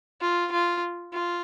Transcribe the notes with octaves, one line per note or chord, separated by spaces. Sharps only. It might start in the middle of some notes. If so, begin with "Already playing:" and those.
F4
F4
F4